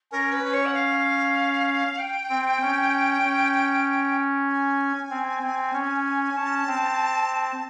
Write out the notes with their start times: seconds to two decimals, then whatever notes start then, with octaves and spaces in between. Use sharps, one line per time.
0.11 C#4 A#4
0.32 B4
0.43 C#4
0.53 C#5
0.65 F#5
0.74 F5
1.98 G5
2.29 C4
2.61 C#4
3.24 C#4
4.48 G#5
5.10 C4
5.42 C4
5.73 C#4
6.36 C#4 A5
6.68 C4